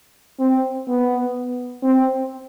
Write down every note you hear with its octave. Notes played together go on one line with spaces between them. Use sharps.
C4
B3
C4